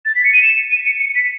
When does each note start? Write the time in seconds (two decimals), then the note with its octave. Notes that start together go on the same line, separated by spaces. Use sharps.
0.05 A6
0.15 B6
0.24 C#7
0.33 D#7
0.42 E7
0.71 D#7
0.86 C#7
1.00 C#7
1.15 B6